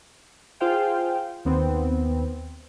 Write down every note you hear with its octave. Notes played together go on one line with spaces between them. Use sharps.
F4 G#4 C5 F5 G5
D#2 B3 C4